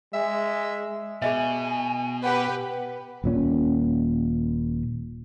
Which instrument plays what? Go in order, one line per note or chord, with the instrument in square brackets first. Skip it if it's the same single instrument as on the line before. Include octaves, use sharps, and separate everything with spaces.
[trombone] G#3 [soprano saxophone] E5
[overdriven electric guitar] B2 [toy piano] G#4 D#5 E5 [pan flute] G#5
[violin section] G4 B4 [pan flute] F#5
[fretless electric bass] D#1 A#2 C#4